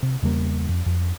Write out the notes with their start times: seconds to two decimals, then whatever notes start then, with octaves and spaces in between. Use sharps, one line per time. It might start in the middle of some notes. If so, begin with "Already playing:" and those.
0.03 C3
0.23 E2 C#3 G3 A#3
0.69 F2
0.86 F2